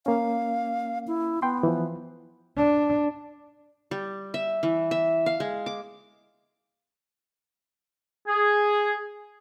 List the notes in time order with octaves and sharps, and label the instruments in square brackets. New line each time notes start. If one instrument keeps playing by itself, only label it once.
[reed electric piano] A#3 C#4 [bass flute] F5
[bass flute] E4
[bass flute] B3 [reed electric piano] G5 C6
[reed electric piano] E3 F3
[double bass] D4
[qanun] G3
E5
E3
E5
F5
G#3
D6
[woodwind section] G#4